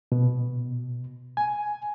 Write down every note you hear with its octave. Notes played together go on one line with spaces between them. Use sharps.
B2
G#5